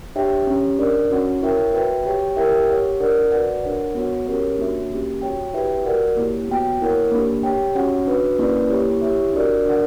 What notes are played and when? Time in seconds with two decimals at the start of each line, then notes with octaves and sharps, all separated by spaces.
0.15 D4 G4 C#5 E5 G5
0.47 C#4 G4 C#5
0.79 D4 A#4 D5
1.10 C#4 F#4 C#5 F#5
1.42 E4 A#4 C#5 E5 G5
1.73 F#4 B4 E5 G5
2.05 G4 C#5 G5
2.37 E4 G4 A#4 E5 G5
2.69 G4 C#5 F#5
3.00 D4 A#4 D5 F#5
3.32 F#4 B4 D5 F#5
3.64 D4 A#4 C#5 F#5
3.95 B3 F#4 C#5 F#5
4.27 C#4 G4 A#4 C#5
4.58 A#3 D4 F#4 C#5 E5
4.90 A#3 C#4 G4
5.22 F#4 C#5 G5
5.53 E4 G4 B4 E5 G5
5.85 F#4 A#4 D5 F#5
6.17 A#3 E4 G4 C#5
6.48 B3 F#4 C#5 G5
6.80 A#3 E4 A#4 C#5 F#5
7.11 A#3 D4 G4
7.43 G4 C#5 G5
7.75 C#4 F#4 C#5 F#5
8.07 D4 F#4 B4
8.39 A#3 C#4 E4 B4 D5
8.70 A#3 E4 G4 C#5
9.02 E4 G4 C#5 E5
9.33 D4 F#4 A#4 D5
9.65 D4 A#4 D5 F#5